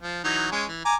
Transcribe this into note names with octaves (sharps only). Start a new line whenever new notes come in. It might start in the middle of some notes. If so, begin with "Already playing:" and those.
F3
E3 F#3 D#4
G#3 C#4
E3
G#5 A#5 D6